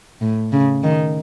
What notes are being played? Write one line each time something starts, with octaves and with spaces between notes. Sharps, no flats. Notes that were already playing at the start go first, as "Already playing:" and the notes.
A2
C#3
D#3